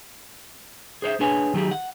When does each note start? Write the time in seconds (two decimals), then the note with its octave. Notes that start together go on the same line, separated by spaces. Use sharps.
1.02 G#4 C5 C#5 E5
1.20 D4 G#4 B4 C#5 G#5
1.54 D#3 F#3 F4 G4 G#4
1.71 F#5